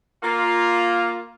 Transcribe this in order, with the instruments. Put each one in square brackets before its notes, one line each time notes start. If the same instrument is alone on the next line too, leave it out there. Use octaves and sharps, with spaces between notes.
[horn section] A#3 F4